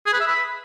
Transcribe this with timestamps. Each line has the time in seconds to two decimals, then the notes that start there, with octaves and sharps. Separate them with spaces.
0.06 G#4
0.13 B4
0.20 E5
0.27 B5